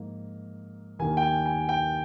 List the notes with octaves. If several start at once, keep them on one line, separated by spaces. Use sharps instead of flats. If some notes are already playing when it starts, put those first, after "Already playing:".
Already playing: G#2 F3 A#3
D#2 D#3 A#3 G#5
G5
G#5
G#5
G5